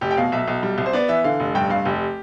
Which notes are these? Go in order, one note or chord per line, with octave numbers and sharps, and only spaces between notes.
F1 G4
G5
B2 F5
B1 E5
B1
G3
C2
C5
B3 D5
E3 E5
D3 F5
F1
G2 G5
G2 F5
F1 G4